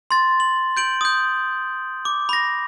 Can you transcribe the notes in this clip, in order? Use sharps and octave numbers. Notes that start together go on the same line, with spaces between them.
C6 A6
F#7
G6 D7 F#7
D#6 G6
D6
B5 A#6